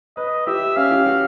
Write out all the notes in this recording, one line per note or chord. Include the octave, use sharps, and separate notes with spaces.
B4 D#5
G4 E5
C#4 F5
G4
F#4